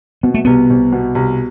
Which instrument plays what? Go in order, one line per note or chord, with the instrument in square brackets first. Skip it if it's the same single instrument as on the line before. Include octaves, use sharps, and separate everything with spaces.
[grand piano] B2 [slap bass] B3
[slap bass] A3
[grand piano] C2 [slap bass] B3
[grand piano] C2
B2
C2